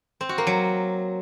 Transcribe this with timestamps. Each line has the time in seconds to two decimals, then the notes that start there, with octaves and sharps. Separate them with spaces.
0.21 C4
0.29 F#4
0.38 A#3
0.47 F#3